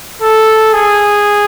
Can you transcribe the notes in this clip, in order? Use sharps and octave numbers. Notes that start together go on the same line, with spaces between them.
A4
G#4